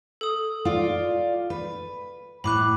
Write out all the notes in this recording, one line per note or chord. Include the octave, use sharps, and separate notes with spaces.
A4 D#6
F4 D5
B4
A2 B5 D6 F#6